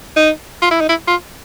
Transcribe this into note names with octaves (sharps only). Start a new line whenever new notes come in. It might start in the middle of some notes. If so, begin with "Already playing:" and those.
D#4
F4
E4
D#4
E4
F4